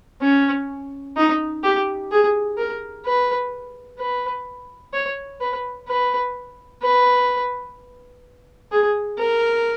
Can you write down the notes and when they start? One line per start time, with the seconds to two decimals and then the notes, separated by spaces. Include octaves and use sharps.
0.22 C#4
1.17 D#4
1.64 G4
2.11 G#4
2.58 A#4
3.05 B4
3.99 B4
4.93 C#5
5.40 B4
5.88 B4
6.83 B4
8.72 G#4
9.18 A#4